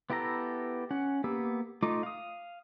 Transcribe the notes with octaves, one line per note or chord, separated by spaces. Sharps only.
B3 E4 G4 A4 A#5
C#4 F#5
A#3 B3 G4 E6
A3 D#4 F4 D6
F5 D#6